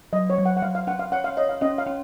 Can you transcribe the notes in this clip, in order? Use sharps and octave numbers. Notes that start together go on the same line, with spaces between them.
F#3 D#5
C#5
F#3
F#5
F#5
F#3 F5
F5
C#4 F#5
F5
C#5 F#5
F5
C#5 D#5
F5
C#4 D#5
F5
C#4